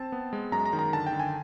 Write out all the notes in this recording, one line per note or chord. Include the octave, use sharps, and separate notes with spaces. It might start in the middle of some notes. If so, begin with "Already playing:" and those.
Already playing: C4 A5
B3
G#3
F#2 A#5
A#5
D#3
A#5
D3 A5
G5
D3
G#5